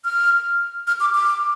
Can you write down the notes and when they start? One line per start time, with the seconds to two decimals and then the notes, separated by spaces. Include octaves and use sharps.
0.05 F6
0.87 F6
1.00 D6
1.15 D6